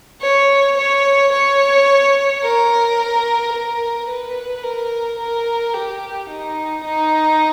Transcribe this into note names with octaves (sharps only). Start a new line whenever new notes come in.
C#5
C#5
C#5
A#4
A#4
B4
A#4
A#4
G4
D#4
D#4